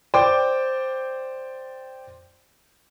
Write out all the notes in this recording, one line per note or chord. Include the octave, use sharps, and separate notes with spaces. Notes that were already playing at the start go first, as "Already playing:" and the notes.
C5 D5 G5 D6